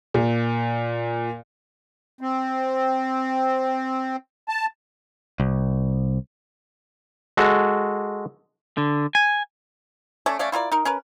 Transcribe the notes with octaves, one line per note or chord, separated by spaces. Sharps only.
A#2
C4
A5
C2
G#3 F#4 A4
D3
G#5
A3 C#4 A4 D5
A3 C#4 D5 F5
E4 F4 A#4 D5
D#4 A#4
C#4 A#4 B4